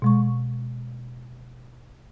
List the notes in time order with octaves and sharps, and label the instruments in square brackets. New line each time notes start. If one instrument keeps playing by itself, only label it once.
[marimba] B2 G#3 C#6